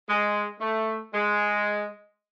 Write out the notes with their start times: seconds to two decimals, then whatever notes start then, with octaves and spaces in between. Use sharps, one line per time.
0.09 G#3
0.60 A3
1.14 G#3